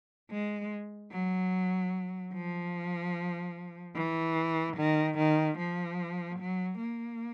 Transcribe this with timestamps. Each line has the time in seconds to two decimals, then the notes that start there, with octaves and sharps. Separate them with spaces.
0.31 G#3
1.12 F#3
2.34 F3
3.95 E3
4.77 D#3
5.18 D#3
5.58 F3
6.39 F#3
6.81 A#3